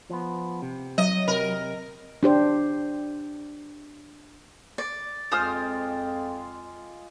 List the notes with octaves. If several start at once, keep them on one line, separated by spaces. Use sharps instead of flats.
F3 B3
C3
F#3 D#5
C3 A#4
D4 G4 C5
D5
F2 G#3 F4 C5 D#6 F6